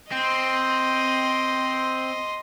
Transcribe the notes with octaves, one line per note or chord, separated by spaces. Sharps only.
C4 D#5 C6